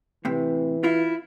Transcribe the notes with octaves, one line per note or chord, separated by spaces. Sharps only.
A2 C3 E3
E4 F4